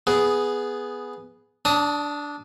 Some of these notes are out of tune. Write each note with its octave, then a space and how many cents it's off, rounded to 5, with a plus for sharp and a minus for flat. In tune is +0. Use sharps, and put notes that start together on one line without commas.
B3 +0 G#4 +0
D4 -10 A5 +25 D#6 +15